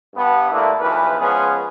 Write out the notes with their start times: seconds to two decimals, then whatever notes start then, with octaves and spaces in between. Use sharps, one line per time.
0.14 G2 B3
0.51 D3 A3 A#3 D4 E4
0.79 B1 E2 E3 F3 B4
1.18 F3 G#3 B3 C#4 G#4 B4